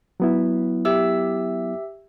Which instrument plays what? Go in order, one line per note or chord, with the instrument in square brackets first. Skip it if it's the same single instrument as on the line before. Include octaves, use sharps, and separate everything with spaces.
[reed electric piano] F#3 B3 E4
[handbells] G4 E5 E6